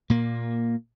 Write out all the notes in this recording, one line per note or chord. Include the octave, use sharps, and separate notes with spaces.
A#2 A#3